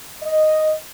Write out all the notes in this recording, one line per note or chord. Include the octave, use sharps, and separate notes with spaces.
D#5